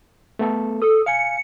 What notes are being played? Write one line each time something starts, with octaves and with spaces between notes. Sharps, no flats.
A3 B3 A4
A4 D#6
F5 G#5 C#7